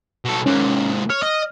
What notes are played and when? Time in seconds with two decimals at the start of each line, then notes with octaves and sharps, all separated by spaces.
0.25 B2 A4
0.46 G#2 A#3 C#4
1.10 C#5 F6
1.22 D#5